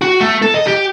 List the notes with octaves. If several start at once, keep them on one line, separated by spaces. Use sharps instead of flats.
F#4
A3
A4
D#5
G4